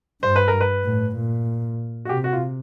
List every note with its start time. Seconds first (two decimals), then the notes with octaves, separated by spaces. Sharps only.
0.23 G2 C5
0.36 B4
0.48 A#4
0.61 B4
0.85 A2
1.16 A#2
2.05 F#4
2.09 C3 G4
2.24 F#4
2.33 F4